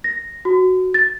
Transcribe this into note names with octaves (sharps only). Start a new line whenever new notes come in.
A#6
F#4
A6